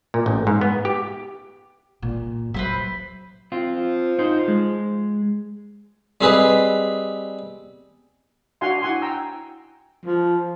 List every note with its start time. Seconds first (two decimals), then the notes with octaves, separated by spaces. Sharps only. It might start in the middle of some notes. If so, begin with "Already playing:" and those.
0.14 A#2
0.26 A1
0.47 G#2
0.61 B3
0.85 G4
2.02 A#2
2.54 F#3 B4 C5 E5
3.52 C4 F4
3.73 F3
4.19 D#4 C5
4.48 G#3
6.21 G3 C4 G#4 B4 D#5
8.61 D4 F#4 F5 F#5 G#5 C6
8.82 E4 F#5 G#5 C6
9.02 G5 A#5 E6
10.05 F3